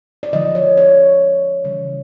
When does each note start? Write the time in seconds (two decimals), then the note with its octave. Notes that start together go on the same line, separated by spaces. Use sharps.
0.23 D5
0.33 D3 F3 G#3 D#5
0.55 C#5
0.77 C#5
1.64 C#3 E3 G3